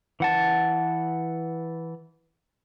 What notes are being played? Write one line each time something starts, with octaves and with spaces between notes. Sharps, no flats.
E3 F#5 A5